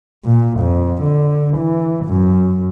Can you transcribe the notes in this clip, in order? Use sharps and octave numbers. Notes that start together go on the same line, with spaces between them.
A#2
F2
D3
E3
F#2